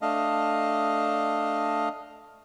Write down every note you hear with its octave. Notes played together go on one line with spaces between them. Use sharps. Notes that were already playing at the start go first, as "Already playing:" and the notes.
A3 D4 D#5 F5